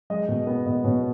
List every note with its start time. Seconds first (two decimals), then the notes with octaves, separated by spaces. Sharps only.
0.10 G#3 D#5
0.28 B2
0.47 B3
0.66 B2 D#5
0.84 B2 C#5